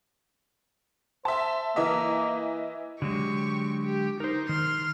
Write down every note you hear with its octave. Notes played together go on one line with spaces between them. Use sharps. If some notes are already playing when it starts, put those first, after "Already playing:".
C5 E5 A5
E3 A#3 D#5 E5
D3 F#3 G#3 G4 C#6
G4
D#4 A#4 C5
D#3 C6 F6